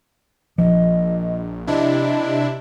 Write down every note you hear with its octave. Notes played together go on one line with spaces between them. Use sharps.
A#1 F3 D#5
C3 D4 E4 D#5